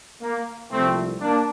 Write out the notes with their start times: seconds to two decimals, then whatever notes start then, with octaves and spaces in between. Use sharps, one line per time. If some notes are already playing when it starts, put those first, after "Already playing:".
0.22 A#3
0.71 C2 A#2 F3 A3 C4
1.20 A#3 D4